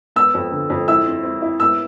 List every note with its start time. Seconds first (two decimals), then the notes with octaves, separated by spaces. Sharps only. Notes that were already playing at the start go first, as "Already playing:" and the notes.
0.16 B3 E6
0.35 F2
0.52 D3
0.70 F2
0.88 E4 E6
1.06 C4
1.23 C4
1.42 E4
1.60 B3 E6